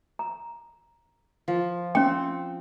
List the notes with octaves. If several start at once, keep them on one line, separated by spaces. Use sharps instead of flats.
A#5
F3
C4 C#4 G5